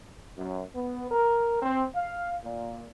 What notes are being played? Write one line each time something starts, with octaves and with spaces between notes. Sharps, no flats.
F#2
B3
A#4
C4
F5
A#2